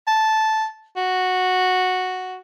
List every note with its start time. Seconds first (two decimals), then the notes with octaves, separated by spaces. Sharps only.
0.08 A5
0.97 F#4